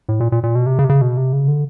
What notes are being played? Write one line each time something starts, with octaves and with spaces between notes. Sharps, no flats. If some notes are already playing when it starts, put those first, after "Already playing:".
A2
A#2
A#2
A#2
B2
C3
C#3
C3
C#3
B2
C3
C#3
D3